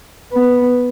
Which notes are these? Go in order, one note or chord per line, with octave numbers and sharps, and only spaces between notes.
B3